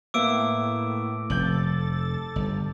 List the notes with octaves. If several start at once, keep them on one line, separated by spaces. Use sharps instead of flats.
A2 A#3 B3 E5 D6 E6 D7
F1 A4 G6 A6 F#7
G1